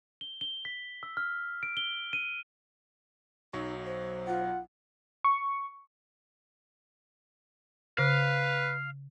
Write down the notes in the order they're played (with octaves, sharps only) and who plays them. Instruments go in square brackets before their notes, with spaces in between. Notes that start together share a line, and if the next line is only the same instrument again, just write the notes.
[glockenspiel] G7
G7
B6
E6
F6
D7
G7
D#7
[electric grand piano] B1 F#3 C#6 [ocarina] D#4
[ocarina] C5
[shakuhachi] F4 [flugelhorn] F#5
[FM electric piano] C#6
[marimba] C#3 [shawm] B4 [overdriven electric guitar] F5